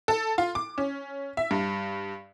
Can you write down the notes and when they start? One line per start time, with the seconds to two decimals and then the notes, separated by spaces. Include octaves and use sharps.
0.08 A4
0.38 F4
0.55 D6
0.78 C#4
1.37 E5
1.51 G2